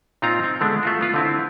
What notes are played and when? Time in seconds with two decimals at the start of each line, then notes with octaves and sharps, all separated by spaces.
0.22 A#2 C4 D#4 F4 A#5
0.44 C4
0.61 D3 G#3 A3 B3 D4
0.83 A3 F4 F#4
1.01 B3 F4 B4
1.14 D3 C4 E4